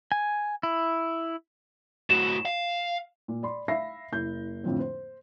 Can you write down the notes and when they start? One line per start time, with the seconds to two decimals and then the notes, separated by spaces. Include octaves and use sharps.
0.12 G#5
0.63 E4
2.10 A2 F#4 E7
2.45 F5
3.28 A#2
3.43 D5 B5 C6
3.68 E5 F5 B5 A#6 C7
4.12 F#1 E4 G6
4.64 F2 A2 D3 F3 C4
4.79 C5